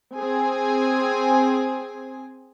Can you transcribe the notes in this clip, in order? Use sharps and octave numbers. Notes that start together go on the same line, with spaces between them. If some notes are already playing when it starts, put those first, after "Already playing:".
C4 G#4 G#5